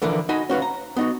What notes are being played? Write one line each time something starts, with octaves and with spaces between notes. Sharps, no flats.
D3 E3 F3 A#4 B4
D#4 F#4 D#5 G#5 B5
C#4 F#4 B4 F5
A#5
B3 D#4 F#4